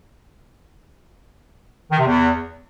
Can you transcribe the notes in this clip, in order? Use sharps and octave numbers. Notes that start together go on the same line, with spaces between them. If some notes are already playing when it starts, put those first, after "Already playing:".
D#3
C3
E2